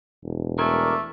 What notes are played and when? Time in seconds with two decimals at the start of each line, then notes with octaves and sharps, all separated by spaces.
0.24 E1
0.59 A3 A#4 D5 G#5